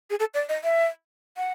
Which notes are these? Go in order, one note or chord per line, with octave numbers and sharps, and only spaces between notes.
G#4
A4
D5
D#5
E5
F#5